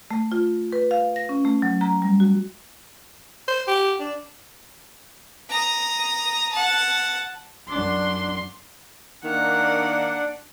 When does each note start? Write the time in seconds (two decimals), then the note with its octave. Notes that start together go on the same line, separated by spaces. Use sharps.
0.11 A3
0.32 F4
0.72 B4
0.91 F5
1.16 A#6
1.29 C#4
1.45 A3
1.62 F#3
1.81 A#5
2.02 G3
2.20 F#4
3.48 C5
3.68 G4
4.00 D4
5.50 A#5 D#6
6.52 F#5 A5
7.69 F#2 D4 C6
9.24 D#3 A#3 D4 F#5